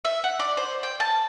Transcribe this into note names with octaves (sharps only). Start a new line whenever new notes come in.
E5
F#5
D5
C5
G5
A5